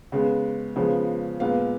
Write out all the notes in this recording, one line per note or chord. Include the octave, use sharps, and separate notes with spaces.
C#3 G#3 B3
C#3 F3 G#3 B3
A#2 G#3 B3 F5